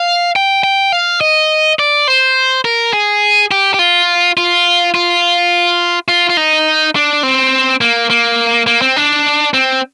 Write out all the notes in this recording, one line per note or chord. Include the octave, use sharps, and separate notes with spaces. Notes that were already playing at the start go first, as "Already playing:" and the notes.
Already playing: F5
G5
G5
F5
D#5
D5
C5
A#4
G#4
G4
G4
F4
F4
F4
F4
F4
D#4
D4
C4
A#3
A#3
A#3
C4
D4
C4